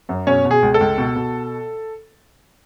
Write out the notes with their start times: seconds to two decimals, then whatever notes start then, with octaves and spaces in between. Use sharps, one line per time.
0.09 F#2
0.27 B2 C#4 C#5
0.45 B2
0.51 G#4
0.62 C#2
0.74 A4
0.80 C#2
0.98 B2
1.16 B2